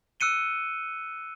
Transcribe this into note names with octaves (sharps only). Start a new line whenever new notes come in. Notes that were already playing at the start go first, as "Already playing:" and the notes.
E6 F#6 C#7 D#7 G7